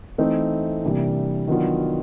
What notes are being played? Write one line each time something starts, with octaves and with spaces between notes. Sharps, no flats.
E3 A3 C4 D#4
C3 E3 G3 A#3 D4
D#3 F#3 B3 D4 F4